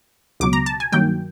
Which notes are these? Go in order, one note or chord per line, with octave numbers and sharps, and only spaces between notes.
C#2 B2 F#3 D6
A#5
A5
G#5
G2 D#3 F#3 A#3 G5